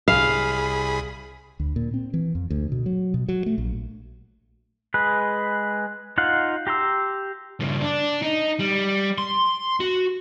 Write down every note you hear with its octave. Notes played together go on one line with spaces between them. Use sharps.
C2 G#4 F5 B5
D2
A#2
C4
E3
F2
D2
B2
F#3
B2
F#3
A3
A#1
G#3 G#4 B4
D#4 F4 F5 F#5
G4 A#5 C6 E6
G2 C#3
D4
D#4
G3
C6
F#4